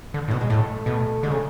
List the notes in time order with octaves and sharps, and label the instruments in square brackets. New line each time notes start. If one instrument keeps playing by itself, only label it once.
[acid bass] D3
A2
[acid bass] B2 [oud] F#3
[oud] G#3
[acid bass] A2 [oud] A3
[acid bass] B2 [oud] A3
[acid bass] D3 [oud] G#3
[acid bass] C#3 [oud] A3